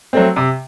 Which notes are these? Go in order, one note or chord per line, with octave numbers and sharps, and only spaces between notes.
F#3 A3 C4
C3